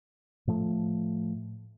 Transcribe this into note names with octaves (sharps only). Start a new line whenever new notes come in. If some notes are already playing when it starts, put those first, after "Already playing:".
A2 F3 A3